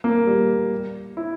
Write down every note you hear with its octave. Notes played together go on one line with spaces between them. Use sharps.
A#3
G3
E4